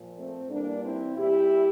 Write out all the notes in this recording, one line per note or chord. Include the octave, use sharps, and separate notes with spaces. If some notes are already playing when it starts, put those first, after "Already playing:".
Already playing: A#2 F3
A3 C4
G2 E3 G3 A#3 D4
C4 E4
A#2 G3 E4 G4